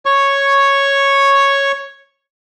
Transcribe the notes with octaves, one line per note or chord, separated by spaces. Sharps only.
C#5 C#6